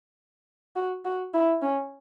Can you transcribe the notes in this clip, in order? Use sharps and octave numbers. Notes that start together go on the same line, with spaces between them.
F#4
F#4
E4
C#4